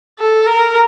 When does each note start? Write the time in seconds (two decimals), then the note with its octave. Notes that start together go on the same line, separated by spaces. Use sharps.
0.19 A4
0.47 A#4